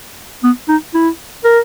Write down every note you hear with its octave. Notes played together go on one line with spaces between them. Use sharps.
B3
D#4
E4
A#4